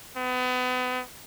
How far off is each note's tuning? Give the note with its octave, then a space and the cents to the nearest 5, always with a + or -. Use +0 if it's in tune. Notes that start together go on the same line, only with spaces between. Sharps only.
B3 +35